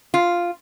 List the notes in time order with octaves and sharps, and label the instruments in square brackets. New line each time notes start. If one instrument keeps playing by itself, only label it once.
[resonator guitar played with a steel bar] F4